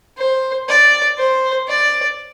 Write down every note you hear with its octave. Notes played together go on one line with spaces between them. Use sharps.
C5
D5
C5
D5